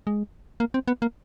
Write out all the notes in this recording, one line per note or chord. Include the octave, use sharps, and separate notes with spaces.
G#3
A#3
C4
B3
A#3